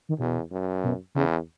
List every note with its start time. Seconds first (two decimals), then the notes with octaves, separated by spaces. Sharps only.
0.09 D#3
0.19 E2 B2
0.51 F#2
0.84 B2
1.15 E2 C#3